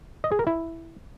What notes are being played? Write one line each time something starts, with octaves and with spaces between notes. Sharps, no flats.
D#5
G#4
A#4
E4